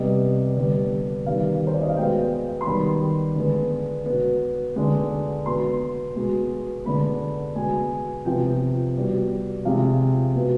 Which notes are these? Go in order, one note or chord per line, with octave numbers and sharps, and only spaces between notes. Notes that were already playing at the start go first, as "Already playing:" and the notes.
Already playing: C3 G3 B3 D#5
D3 G3 B3
D#3 G3 B3 F5
C5
D5
D#5
F5
B2 G#3 B3 G5
C6
D#3 G3 B3 B5
D3 G#3 B3
B2 B3
D3 G#3 B3
B2 B3 C6
B2 G#3 B3
D3 G#3 B3 B5
B2 G#3 B3 G#5
C3 F3 B3 G5
B2 G3 B3
C3 F3 G#3 F5
B2 B3